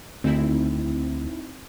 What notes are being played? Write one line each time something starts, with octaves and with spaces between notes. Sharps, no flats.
D2 C4 D#4 E4